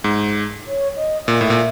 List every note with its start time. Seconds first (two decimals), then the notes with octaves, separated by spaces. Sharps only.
0.04 G#2
0.66 C#5
0.96 D#5
1.22 D#5
1.27 A#2 E5
1.41 A2
1.50 A#2